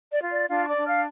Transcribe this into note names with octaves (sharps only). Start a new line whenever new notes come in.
D5
F4
D5
D4 F4 F5
C#6
D5 D6
D4
F5 F6